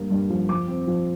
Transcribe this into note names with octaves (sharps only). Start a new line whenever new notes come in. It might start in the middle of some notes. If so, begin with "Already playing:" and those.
Already playing: G2 A#3
G2
F3
F3 D6
C4
F3